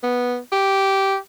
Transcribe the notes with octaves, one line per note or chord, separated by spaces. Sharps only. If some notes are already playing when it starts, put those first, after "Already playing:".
B3
G4